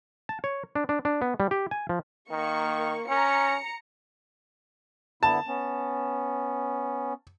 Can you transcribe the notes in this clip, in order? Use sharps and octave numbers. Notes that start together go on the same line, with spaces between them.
A5
C#5
D4
D4
D4
B3
G3
G4
G#5
F3
D#3 A#3 C#6
C#4 A#5 C#7
D3 B3 E4 A5
B3 C#4